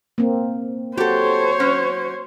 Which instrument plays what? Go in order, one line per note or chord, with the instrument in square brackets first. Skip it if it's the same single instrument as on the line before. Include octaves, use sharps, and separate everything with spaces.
[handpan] A#3 C4
[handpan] F#4 [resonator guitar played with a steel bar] G4 A4 [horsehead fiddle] C5 C#5
[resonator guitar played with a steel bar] F#3 C#4